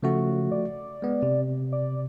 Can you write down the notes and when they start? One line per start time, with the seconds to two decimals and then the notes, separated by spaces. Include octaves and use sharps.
0.03 C#3 F3 A3 F#4
0.52 D5
1.02 G#3 B3
1.23 C3
1.72 D5